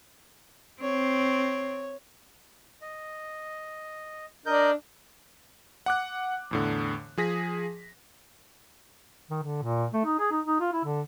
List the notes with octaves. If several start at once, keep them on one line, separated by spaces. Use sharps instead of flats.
C4 C#5
D#5
D4 A#4 D#5 G6
F#5 D6 F#6
E2 A2 D3
F3 G#4 A#6 B6
D#3
D3
A#2
A3
D#4
G#4
D#4
D#4
F4
E4
D3